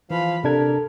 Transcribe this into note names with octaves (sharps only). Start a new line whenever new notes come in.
E3 F3 F5 B5
C3 D4 A4 A#4 G#6